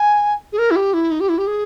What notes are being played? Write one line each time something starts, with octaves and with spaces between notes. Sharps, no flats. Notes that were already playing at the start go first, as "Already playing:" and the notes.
Already playing: G#5
G#4
A#4
E4
G4
E4
D#4
G4
E4
G4
G#4